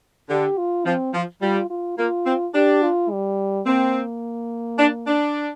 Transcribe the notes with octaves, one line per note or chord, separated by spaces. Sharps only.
D3 G4
F4
F3 C4
F3
G3 F4
F4
A#3 F4
C4
D4 G4
F4
G3
A#3 C4
D4
D4